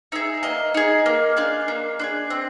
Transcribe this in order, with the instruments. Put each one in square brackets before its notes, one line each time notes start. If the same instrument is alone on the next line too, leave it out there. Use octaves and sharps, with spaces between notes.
[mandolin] D#4 G#4 E5
A#3 D#5
D#4 G#4
A#3
D4 F4 G#4
A#3
D4 F4 G#4
C4